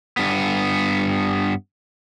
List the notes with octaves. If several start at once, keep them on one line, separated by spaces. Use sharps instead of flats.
G2 B3